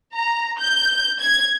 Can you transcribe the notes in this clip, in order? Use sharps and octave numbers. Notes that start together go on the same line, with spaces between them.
A#5
G6
G#6